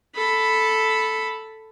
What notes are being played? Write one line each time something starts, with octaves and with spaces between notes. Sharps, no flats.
A4 B5